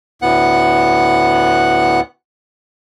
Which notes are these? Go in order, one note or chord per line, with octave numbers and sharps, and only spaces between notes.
D2 A2 B3 F#5 F#6